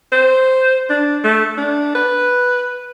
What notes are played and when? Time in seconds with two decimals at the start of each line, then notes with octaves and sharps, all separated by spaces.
0.12 C5
0.90 D4
1.24 A3
1.58 D4
1.95 B4